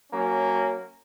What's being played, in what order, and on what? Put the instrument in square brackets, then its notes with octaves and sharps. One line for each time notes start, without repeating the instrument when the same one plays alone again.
[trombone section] F#3 A#3 C#4